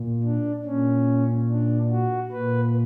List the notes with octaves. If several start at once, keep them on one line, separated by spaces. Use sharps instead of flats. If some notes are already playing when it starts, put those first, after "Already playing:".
Already playing: A#2
D4
A#2 C#4
D4
F#4
A#2 B4